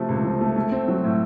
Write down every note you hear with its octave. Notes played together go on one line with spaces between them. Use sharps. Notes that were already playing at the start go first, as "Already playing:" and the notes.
Already playing: C3 F3 A3
C#2
F3
A3
A3
C4
F#3
A2